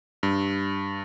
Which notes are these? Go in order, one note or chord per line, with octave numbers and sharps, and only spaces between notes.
G2